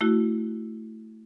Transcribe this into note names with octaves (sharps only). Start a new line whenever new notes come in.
A3 E4 F#4